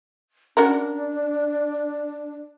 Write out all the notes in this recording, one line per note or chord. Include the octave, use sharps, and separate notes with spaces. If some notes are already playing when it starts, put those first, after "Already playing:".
C#4 D4 F#4 A#4